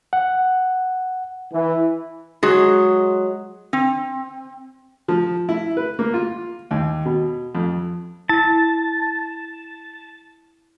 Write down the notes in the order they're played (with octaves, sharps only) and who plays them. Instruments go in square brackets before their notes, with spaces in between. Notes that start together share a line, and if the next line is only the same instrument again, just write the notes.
[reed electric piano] F#5
[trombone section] E3
[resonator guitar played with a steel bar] F#3 G#3 F#4 G#4
C4
[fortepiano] F3
E4
B4
A#3
F4
D#2
B2
F2
[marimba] E4 [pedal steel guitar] A5